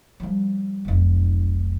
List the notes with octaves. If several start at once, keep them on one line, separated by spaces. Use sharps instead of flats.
F3 G3
F1 B1